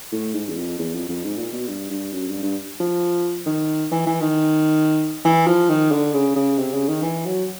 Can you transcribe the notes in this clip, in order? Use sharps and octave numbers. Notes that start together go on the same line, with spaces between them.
A2
G#2
E2
F2
E2
F2
F2
G#2
A#2
B2
G2
G2
F#2
G2
G2
F3
D#3
E3
E3
D#3
E3
F3
D#3
D3
C#3
C#3
C3
C#3
D#3
E3
F#3